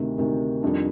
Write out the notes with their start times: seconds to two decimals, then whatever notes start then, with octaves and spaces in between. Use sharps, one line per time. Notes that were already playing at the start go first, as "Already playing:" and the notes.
Already playing: D2 C3 D#3
0.18 D2 C3 D#3
0.63 F2 D#3 G3 D4